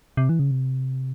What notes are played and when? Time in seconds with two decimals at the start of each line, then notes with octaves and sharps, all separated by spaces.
0.17 C3
0.29 E3
0.39 C#3
0.51 C3